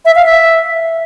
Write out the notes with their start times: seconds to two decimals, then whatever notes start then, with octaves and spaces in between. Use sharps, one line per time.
0.05 E5
0.15 F5
0.26 E5